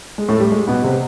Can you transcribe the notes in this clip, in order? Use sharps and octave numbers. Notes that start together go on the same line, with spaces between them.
G#3
A2 A3
G3
G#3
B2 B3
C3 C4